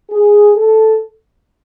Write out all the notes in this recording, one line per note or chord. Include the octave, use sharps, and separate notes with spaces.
G#4
A4